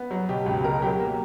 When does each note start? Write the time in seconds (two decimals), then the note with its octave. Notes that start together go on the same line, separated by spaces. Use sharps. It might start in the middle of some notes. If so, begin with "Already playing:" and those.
Already playing: B3
0.11 F#3
0.29 B2 G4
0.46 C#2
0.64 B2 A#4
0.82 F#3 G4
1.00 A#3